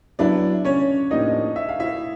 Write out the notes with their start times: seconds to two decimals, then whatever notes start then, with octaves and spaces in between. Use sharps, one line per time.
0.19 F#3 B3 D4 E4 D5
0.65 C#4 C#5
1.11 A2 F3 A#3 D4 D#4 G4 D#5
1.56 E5
1.69 F5
1.80 E4 E5